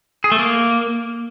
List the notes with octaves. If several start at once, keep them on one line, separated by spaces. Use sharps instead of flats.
G#4
A3
A#3